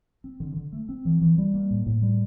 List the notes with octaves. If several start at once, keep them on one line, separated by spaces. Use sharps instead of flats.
C4
D3
D3
A3
C4
E3
E3
G3
A#3
A2
A2
G3